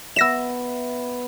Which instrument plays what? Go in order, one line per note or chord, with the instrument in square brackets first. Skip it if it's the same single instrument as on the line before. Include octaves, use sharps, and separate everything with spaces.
[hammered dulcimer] B3 E5 [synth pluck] E6 A#6 E7